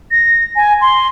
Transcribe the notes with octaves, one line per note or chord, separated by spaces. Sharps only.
A#6
G#5
C6